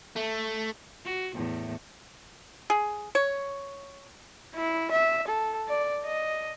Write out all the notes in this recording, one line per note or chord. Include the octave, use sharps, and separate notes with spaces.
A3
F#4
E2 A2
G#4
C#5
E4
E5
A4
D5
D#5